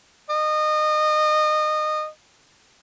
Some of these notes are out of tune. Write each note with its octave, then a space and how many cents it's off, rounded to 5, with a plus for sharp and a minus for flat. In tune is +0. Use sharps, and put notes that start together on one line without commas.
D#5 -25